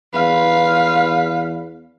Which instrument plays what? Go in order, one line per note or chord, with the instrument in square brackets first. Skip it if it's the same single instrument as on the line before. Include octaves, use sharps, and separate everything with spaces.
[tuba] E2 [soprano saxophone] B4 [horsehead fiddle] F5